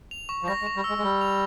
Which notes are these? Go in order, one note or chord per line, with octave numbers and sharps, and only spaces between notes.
F7
C#6
F3
G3 A#6
G#3
C#6
G3
G#3 E6
G#3
G3 E6
F7